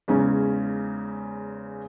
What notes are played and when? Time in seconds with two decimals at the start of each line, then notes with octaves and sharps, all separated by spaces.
0.08 E2 G#2 C#3 C#4